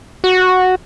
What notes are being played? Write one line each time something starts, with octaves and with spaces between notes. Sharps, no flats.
F#4